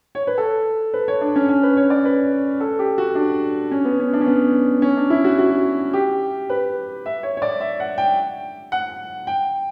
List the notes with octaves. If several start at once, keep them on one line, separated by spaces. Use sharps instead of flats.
C#5
B4
A4
B4
C#5
D4
C#4
C#4
B4
C#5
D5
B4
A4
G4
F#4
D4
C#4
B3
C#4
D4
C#4
B3
C#4
D4
E4
F#4
F#4
G4
B4
E5
C#5
C#5
D5
E5
F#5
G5
F#5
G5